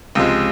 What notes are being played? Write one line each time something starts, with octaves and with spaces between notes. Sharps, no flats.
C#2 C3 F3 G#3